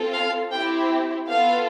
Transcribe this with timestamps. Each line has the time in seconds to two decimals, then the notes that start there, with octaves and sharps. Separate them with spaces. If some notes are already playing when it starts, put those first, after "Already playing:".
Already playing: C4 F4 A4
0.13 F5
0.51 C4 E4 G4 G5
1.28 B3 F4 A4 F5